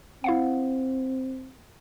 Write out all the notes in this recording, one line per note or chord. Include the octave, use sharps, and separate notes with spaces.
C4 E4 F5 F#5